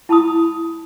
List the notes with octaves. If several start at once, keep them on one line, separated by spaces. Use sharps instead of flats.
E4 A5 B5 D#6